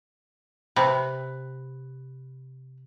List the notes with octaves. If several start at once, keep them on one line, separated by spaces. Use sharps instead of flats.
C3 B4